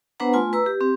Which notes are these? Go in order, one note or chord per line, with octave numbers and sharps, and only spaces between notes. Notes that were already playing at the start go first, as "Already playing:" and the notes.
B3 D4 B4 C5 F#5 A#5
A3 F4 G#5 C6
B4 A#5 E6
G4
C4 G4